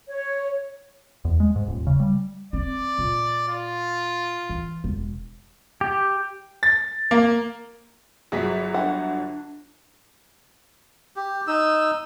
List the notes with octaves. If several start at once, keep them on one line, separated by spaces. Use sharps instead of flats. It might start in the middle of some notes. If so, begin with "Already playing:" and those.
C#5
E2
G#3
G#2
D#1
C#3
G3
C4 D5
A#2
F4
E3
E1
G4
A6
A#3
G1 F#3 G#4 B6
D4 F#5
G4
D#4 E6